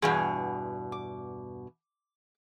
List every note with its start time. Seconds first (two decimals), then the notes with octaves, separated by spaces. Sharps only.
0.02 E2 G2 B2 G#4 G#5
0.92 D6